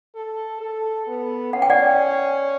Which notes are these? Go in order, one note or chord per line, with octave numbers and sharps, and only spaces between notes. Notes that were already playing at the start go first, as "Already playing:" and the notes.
A4
A4
B3
C#4 F#5
G5
D5 F#5